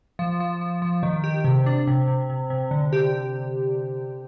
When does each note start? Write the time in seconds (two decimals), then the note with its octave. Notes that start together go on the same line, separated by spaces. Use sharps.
0.19 F3
0.40 F3
0.61 F3
0.82 F3
1.03 D#3
1.24 G4
1.44 C3
1.66 D4
1.87 C3
2.08 C3
2.30 C3
2.50 C3
2.71 D3
2.93 G4